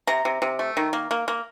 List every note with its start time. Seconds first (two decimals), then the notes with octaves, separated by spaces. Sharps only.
0.07 C3 A#5
0.25 C3
0.42 C3
0.59 A3
0.77 D#3
0.93 A#3
1.11 A#3
1.28 A#3